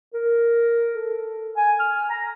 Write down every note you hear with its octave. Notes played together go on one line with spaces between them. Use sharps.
A#4
A4
G#5
F6
A#5